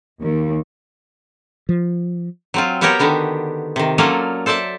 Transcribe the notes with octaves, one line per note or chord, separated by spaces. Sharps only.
D#2
F3
F#3 C4 F4
B3 F#4 G4 A#4 C#5 G5
D3 D#3 B3 D4
C3 D#3
F#3 A#3 C#4 F4 A4 D5
A4 C5 D5 E5 A5